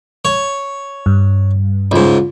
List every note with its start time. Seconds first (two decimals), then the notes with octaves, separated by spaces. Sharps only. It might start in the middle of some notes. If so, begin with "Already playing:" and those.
0.25 C#5
1.06 G2
1.91 C#2 G#2